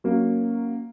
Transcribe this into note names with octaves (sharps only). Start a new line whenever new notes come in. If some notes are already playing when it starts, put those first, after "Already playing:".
F#3 A#3 C#4